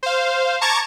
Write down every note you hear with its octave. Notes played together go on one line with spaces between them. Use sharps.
C5 F5
A5 A#5 C#6 D6 G#6 A6